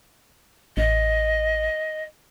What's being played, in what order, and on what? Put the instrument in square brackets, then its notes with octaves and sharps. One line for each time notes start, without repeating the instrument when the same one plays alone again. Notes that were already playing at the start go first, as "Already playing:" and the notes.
[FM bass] A1 [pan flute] D#5